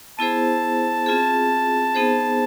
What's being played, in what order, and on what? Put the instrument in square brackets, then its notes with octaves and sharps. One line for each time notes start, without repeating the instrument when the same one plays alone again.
[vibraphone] B3 E4 G#4 C5 [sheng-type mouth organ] A5
[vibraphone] C4 F4 G#4
B3 D#4 G#4 C5